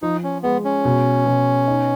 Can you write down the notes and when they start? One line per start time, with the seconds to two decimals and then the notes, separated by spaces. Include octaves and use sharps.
0.02 F3 D#4
0.24 C#4
0.43 G#3 B3
0.65 C#4
0.85 B2
1.26 B2
1.67 D#4